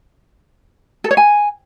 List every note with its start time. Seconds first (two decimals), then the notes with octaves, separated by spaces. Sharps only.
1.04 A4
1.11 C#5
1.17 G#5